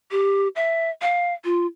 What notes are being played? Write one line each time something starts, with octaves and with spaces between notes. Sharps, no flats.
G4
E5
F5
F4